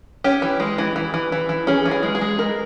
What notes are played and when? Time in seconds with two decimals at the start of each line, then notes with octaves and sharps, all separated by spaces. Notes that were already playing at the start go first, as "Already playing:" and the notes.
0.24 C#4 G4
0.42 E3
0.60 G#3
0.78 E3
0.96 E3
1.14 E3
1.32 E3
1.49 E3
1.67 C#4 G#4
1.85 E3
1.91 G#4
2.03 G#3
2.15 G#4
2.21 G#3
2.39 E3 A#4